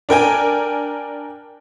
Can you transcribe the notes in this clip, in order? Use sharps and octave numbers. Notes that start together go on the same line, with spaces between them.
D4 A#4 G5 G#5